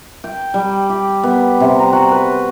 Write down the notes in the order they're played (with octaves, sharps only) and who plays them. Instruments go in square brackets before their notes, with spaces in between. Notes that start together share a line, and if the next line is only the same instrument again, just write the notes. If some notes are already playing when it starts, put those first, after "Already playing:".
[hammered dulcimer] G5
G3
G4
B3
C3
A#5
F#4
B4